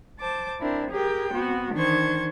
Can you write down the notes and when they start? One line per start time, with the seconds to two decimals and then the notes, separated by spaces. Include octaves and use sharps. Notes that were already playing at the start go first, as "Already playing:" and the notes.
0.20 C5 A5 D6
0.60 C4 D4 E4 A#4
0.91 G4 G#4 A#4 G5
1.34 B3 C4 F#4
1.74 D#3 E3 D4 C5 C#6 G#6